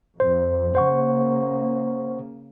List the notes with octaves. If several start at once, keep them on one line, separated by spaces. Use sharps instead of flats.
F2 C5
C#3 A#3 C5 F#5 C#6